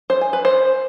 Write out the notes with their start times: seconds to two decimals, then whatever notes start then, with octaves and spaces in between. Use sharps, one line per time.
0.10 C5
0.21 G#5
0.33 B4
0.45 C5